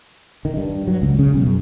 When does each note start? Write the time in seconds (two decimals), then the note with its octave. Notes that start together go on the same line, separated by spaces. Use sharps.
0.45 D#3
0.57 G2
0.88 F#3
1.02 C#2
1.19 C#3
1.34 B1
1.47 F#2